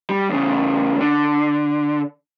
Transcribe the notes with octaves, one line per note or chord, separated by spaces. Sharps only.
G3
E2 C#3
D3